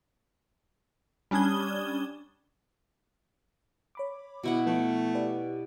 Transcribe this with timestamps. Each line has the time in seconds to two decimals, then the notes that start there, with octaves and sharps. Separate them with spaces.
1.31 G3 C#4 D4 D#6 G#6 G7
3.95 C#5 B5 D6
4.43 B2 E4 F#4 F#5
4.66 F3 A3 B3 F4
5.15 G4 B4 D5